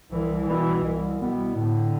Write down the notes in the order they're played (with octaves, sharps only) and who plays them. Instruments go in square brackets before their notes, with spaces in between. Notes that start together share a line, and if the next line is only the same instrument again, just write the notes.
[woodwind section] C2 [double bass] E3
[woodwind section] B2 G3 B3 E4 [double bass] E3
[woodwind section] C2
B2 G3 B3 E4
[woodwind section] A2 [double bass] D3